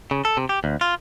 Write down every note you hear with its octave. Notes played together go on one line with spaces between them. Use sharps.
C#3
A4
C3
G4
D2
F4